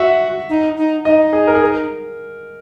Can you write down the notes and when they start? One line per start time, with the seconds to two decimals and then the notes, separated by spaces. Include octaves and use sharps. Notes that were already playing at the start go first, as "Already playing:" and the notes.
Already playing: F#4 E5 F#5
0.49 D#4
0.77 D#4
1.05 D#4 D#5
1.33 G#4
1.47 A#4
1.55 G#4
1.62 A#4